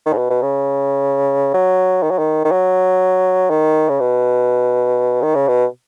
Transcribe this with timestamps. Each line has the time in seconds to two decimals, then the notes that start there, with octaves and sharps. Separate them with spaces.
0.06 D#3
0.13 G#2
0.17 B2
0.30 B2
0.42 C#3
1.54 F#3
2.03 D#3
2.11 F#3
2.19 D#3
2.45 D#3
2.52 F#3
3.50 D#3
3.89 C#3
4.00 B2
5.22 D#3
5.35 C#3
5.48 B2